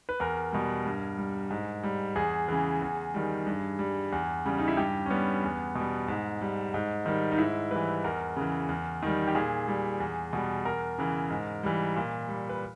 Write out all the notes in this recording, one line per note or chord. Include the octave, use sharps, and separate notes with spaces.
B4
E2 A#4
B2 G3
G2
G3
G#2
G3
E2 G#4
C#3 E3
E2
D#3 G3
G2
G3
E2
C#3 G3
D#4
E4
G2 G4
C#4
G3 B3
E2
B2 G3
G#2
G3
G#2
D#3 G3
D#4
G#2 E4
E3 G3 B4
E2 A#4
C#3 E3
E2
D#3 G3
G4
A#2 G#4
G3
E2
B2 G3
E2 A#4
C#3 E3
G#2
E3 G3
A#2
G3
B4